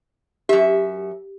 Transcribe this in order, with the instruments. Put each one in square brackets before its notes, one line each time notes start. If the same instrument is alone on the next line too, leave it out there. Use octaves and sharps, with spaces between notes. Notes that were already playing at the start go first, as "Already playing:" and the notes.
[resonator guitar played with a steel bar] F#2 E5 [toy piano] G4